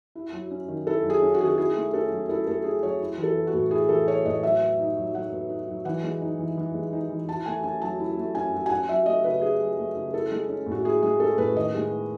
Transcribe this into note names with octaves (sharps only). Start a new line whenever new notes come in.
E4
F#3
C#4
D#3
E4 A4
F#3
G#4
C#4
F#4
D#3 G#4
F#4
E4 G#4
A3
C#4 A4
F#3
E4 A4
A3 A4
C#4 G#4
F#3 C#5
E4
E3
A4
B3
F#4
A2
E4 G#4
E3 A4
B3 C#5
A2 D#5
F#3 E5
B3
D#4
F#3
F#3 F#5
B3
D#4
F#3
E3 F#5
G#3
D#4
E3
E3
G#3
D#4
E3
E4 A5
A3 G#5
C#4 G#5
F#3 A5
E4
A3
C#4 G#5
F#3
G#5
C#4 F#5
F#3 E5
A3 D#5
C#3 B4
C#4 G#4
F#3
A3
C#3
E4 A4
G#3
C#4
A2
F#4
E4 G#4
G#3 G#4
C#4 A4
A2 B4
D#3 D#5
G#3
B3